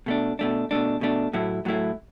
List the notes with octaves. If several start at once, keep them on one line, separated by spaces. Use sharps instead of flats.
B2 A3 D4
B2 A3 D4
B2 A3 D4
B2 A3 D4
A2 F#3 A3 E4
A2 F#3 A3 E4